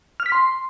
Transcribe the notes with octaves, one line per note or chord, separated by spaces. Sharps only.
F6
B6
C6